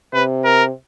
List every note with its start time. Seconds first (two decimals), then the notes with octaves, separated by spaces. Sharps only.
0.14 C3 B4
0.45 A#4